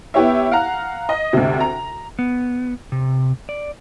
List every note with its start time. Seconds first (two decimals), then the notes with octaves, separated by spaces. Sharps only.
0.14 B3 E4 G4 C#5 E5
0.51 F5 F#5 A#5
1.09 D#5
1.33 D2 C3
1.60 A#5
2.19 B3
2.92 C3
3.49 D5